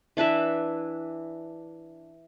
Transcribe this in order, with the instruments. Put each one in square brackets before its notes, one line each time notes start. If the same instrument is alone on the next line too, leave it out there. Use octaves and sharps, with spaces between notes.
[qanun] E3 D4 B4 E5